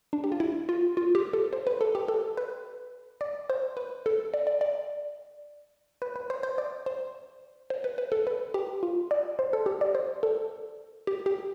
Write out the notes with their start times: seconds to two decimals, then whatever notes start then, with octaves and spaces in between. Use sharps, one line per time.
0.13 D4
0.24 G4
0.32 F4
0.40 E4
0.69 F4
0.97 F4
1.15 G4
1.33 A4
1.53 C5
1.67 B4
1.81 A4
1.95 G4
2.08 A4
2.37 B4
3.21 D5
3.50 C5
3.77 B4
4.06 A4
4.34 D5
4.47 D5
4.61 D5
6.02 B4
6.16 B4
6.30 C5
6.43 C5
6.58 D5
6.86 C5
7.70 C5
7.84 B4
7.98 B4
8.12 A4
8.27 B4
8.54 G4
8.83 F4
9.11 D5
9.39 C5
9.53 A4
9.66 G4
9.81 D5
9.95 C5
10.23 A4
11.07 G4
11.26 G4